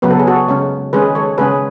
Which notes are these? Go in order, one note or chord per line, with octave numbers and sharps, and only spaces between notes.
C#3 F#3 B3 B4
A4
G#4
F#4 A4
C#3 G#3 C#4
D#3 G#3 C#4 G#4 B4
A4 C#5
C#3 G#3 C#4 G#4 B4